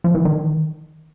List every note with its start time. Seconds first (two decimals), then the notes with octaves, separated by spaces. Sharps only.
0.04 F3
0.15 E3
0.25 D#3